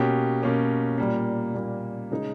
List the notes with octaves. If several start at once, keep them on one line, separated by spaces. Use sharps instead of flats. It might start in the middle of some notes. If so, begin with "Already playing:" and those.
Already playing: B2 A#3 C#4 G4
B2 A#3 C#4 G4
A#2 G3 A#3
A#2 G3 A#3
C#3 G#3 D#4 G#4